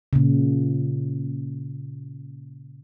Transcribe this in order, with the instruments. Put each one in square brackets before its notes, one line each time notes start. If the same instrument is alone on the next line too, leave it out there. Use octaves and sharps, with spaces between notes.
[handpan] A#2 C#3